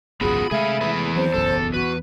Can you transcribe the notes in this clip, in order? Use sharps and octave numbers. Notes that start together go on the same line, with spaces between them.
G#1 C#2 F#2 B3 F4 F#4 G#4 B5
C3 G#3 A3 G#4 E5 F5
E2 E3 G#4 B4 B5
F#3 C4 C5
F#1 B1 F#2 A4
F#4 B4